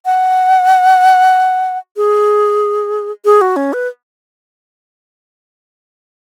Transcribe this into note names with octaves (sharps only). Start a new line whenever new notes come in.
F#5
G#4
G#4
F#4
C#4
B4